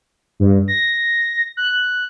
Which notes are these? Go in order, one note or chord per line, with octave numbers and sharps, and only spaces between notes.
G2
A#6
F#6